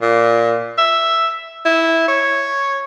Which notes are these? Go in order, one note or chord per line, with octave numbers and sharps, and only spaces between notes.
A#2
E5
E4
C#5